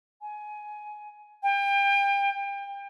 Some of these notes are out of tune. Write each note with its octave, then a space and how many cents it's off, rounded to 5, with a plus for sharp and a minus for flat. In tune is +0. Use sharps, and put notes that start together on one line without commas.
G#5 +20
G5 +30